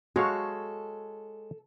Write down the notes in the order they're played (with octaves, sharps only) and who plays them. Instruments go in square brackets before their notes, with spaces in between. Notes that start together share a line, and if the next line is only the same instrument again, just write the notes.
[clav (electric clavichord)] G#3 C#5 F5 [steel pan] F#4 [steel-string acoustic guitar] A4